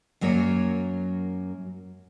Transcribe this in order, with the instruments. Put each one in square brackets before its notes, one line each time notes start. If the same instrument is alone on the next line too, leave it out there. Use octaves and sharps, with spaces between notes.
[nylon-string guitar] F#2 F#3 A#3 A#4 C#5